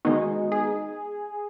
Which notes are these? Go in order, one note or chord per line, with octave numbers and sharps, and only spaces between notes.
D#3 G#3 B3 D#4 F#4
G#4